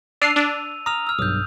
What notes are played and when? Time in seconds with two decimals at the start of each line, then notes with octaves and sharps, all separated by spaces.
0.22 D4 E6 C7 D#7 F7
0.36 D4
0.86 A#5 D#6 F6 F7
1.07 E6 F6
1.19 B1 G2 D#6 G6